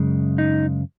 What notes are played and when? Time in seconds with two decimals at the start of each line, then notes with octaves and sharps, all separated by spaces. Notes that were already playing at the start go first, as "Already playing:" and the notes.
Already playing: F#2 C#3 G#3
0.38 D#4